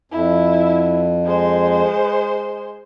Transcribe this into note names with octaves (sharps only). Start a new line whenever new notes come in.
F2 E4
G#3 C5